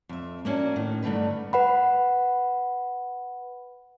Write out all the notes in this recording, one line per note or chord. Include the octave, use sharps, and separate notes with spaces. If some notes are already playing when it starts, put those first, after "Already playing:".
F2 E5
A#3 B3 C#4 D4 F#4
A2 D#3
G2 D3 A3 D#4 B4
B4 F#5 B5